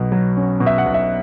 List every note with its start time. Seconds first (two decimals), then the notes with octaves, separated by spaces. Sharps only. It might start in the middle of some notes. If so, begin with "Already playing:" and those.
Already playing: B1 B2
0.12 F#3
0.37 C#4
0.60 B2
0.66 E5
0.78 F#5
0.86 B1
0.94 E5